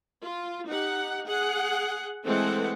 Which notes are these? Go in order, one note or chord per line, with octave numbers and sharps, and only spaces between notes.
F4
D#4 G4 F#5
G#4 F#5
E3 G#3 A3 C4 A4 F#5